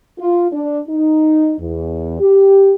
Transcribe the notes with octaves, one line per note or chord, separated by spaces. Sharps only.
F4
D4
D#4
E2
G4